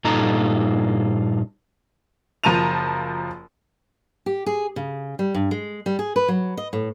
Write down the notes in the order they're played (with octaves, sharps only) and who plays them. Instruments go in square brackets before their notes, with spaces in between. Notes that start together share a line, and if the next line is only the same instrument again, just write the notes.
[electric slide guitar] G2 A#2 D#4 F4 A4 A#5
[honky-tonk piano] F#1 F3 A#4 A5 D#7 F7
[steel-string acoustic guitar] G4
G#4
C#3
G3
G2
G#3
G3
G#4
B4
F#3
D#5
A2